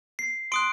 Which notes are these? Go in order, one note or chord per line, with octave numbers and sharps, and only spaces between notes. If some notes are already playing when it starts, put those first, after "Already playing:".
C7
C6 D#6 F#6 D7